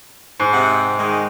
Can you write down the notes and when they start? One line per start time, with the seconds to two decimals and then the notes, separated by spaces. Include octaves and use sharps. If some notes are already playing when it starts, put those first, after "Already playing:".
0.40 G#2
0.53 C3 F#5
0.99 D#3 G#3